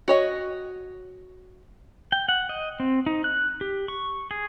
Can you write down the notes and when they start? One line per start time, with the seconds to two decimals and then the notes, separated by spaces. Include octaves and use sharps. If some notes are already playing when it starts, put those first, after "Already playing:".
0.08 F#4 C#5 D#5
2.12 G5
2.29 F#5
2.49 D#5
2.80 C4
3.06 D#4
3.24 F#6
3.61 G4
3.88 C#6
4.31 G#4